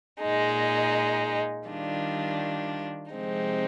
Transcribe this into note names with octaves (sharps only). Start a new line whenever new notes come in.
A#2 G#3 D#4
D#3 G3 D4 F4
C3 F3 G#3 C4 D#4